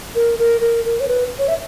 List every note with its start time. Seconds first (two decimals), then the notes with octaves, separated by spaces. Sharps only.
0.15 A#4
0.39 A#4
0.61 A#4
0.85 A#4
1.00 C#5
1.08 B4
1.39 C#5
1.48 E5